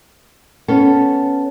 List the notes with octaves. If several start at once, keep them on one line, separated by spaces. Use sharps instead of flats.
B3 C#4 A4